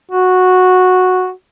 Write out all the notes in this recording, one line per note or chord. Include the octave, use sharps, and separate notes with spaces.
F#4